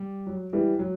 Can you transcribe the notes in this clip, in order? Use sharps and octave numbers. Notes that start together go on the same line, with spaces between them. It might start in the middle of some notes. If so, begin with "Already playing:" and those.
Already playing: G3
F#3
E3 G3
F#3